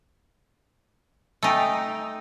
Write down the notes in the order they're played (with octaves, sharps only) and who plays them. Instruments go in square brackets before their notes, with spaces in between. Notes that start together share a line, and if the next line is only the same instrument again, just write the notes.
[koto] A3 D#4 [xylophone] G5 G#5 E6